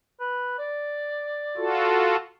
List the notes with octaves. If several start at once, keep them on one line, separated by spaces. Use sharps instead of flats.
B4
D5
F4 F#4 A4